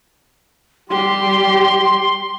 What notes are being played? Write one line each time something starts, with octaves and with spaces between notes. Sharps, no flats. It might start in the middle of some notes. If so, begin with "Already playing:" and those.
G3 G4 C6